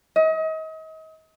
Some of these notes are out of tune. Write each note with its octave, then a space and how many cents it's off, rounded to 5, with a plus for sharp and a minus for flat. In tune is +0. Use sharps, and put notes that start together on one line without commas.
D#5 +35